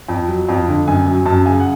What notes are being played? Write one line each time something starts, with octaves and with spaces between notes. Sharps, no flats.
F2
F#3
F2
D3
F#2 G#5
F#3 G#5
F#2 A5
C#3 G#5
F#5